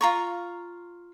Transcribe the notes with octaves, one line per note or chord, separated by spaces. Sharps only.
F4 A#5 C#6